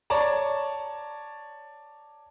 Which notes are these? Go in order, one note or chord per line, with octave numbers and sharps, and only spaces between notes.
C#5 D5 A5 A#5